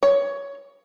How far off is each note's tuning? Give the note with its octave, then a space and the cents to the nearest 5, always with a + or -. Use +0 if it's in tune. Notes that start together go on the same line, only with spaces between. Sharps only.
C#5 +15